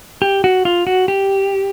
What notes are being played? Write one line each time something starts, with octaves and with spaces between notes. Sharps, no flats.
G4
F#4
F4
F#4
G4